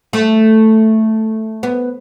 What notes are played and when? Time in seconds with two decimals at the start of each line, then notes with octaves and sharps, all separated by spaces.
0.13 A3
1.63 B3